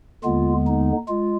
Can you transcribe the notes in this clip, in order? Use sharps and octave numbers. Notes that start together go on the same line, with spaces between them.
D#2 D3 G#3 B3 F4
D#4
G#3 F4